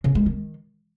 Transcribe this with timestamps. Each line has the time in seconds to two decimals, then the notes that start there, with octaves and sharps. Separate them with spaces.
0.04 C#3
0.15 G#3
0.26 D#3